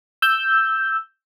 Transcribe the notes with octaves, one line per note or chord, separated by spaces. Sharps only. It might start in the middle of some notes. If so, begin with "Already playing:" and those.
E6 G6